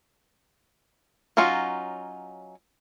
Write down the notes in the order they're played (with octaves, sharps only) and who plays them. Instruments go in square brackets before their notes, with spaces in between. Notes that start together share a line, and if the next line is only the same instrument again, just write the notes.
[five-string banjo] F#3 C#4 D#4 F4 F#4